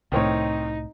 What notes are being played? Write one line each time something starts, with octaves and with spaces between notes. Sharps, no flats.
C2 A2 D#3 C4 D#4 C#5